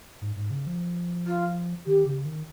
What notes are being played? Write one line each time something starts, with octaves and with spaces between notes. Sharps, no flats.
G#2
G#2
C#3
F3
F4
D#3 G4
C#3
D#3